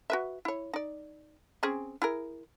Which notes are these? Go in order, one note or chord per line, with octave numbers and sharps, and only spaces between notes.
F#4 B4 E5
E4 C#5
D#4 D5
C4 C#4 G#4
E4 G#4 A#4